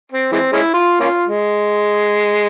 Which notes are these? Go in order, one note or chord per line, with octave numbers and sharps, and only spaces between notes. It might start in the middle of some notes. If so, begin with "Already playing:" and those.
C4
E3 G#3 C4
G#3 C#4 E4
F4
A#3 C#4 F4
G#3